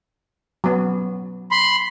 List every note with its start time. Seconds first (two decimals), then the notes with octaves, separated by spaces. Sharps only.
0.64 F#3 B3
1.51 B5 C6